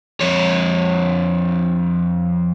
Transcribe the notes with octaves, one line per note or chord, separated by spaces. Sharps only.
F2 C#5